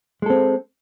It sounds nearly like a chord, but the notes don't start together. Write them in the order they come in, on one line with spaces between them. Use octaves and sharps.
G#3 A4 C4